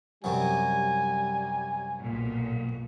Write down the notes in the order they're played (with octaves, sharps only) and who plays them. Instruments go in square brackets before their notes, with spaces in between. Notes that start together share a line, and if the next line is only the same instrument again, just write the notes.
[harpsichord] F#2 C3 F#3 [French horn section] G3 [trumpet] G#5
[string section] B1 A#2